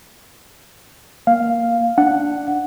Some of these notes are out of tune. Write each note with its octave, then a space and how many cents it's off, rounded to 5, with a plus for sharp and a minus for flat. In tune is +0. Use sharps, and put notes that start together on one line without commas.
A#3 +0 F5 +0
D4 +0 F#5 +0